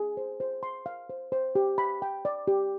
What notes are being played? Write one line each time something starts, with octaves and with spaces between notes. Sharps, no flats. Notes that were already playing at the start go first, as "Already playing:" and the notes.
Already playing: G#4
C5
C5
C6
F5
C5
C5
G4
B5
G5
D5
G4